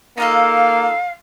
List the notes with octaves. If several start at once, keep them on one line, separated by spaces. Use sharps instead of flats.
A#3 D#4 F4 A4 F5